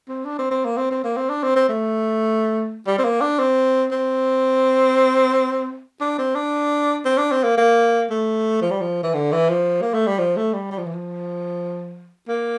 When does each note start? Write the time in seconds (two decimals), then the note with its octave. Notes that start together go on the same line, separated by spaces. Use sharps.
0.08 C4
0.25 D4
0.38 C4
0.51 C4
0.65 A#3
0.77 C4
0.91 C4
1.04 A#3
1.17 C4
1.29 D4
1.43 C4
1.56 C4
1.69 A3
2.87 G3
2.98 C4
3.04 A#3
3.21 D4
3.39 C4
3.91 C4
6.00 D4
6.18 C4
6.35 D4
7.05 C4
7.18 D4
7.31 C4
7.43 A#3
7.57 A#3
8.10 A3
8.61 F3
8.71 G3
8.81 F3
9.03 E3
9.14 D3
9.32 E3
9.49 F3
9.81 A#3
9.94 A3
10.07 G3
10.19 F3
10.36 A3
10.53 G3
10.71 G3
10.78 F3
10.86 E3
10.93 F3
12.28 A#3